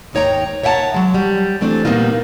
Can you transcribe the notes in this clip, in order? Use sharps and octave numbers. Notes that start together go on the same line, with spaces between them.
D#2 G#2 D#4 C#5 G5 A#5
C#5 E5 F#5 G5 A5 A#5
F#3 G#3
G3
E3 A3 C4 D4
A#2 G3 A#3 B3 D#4 F4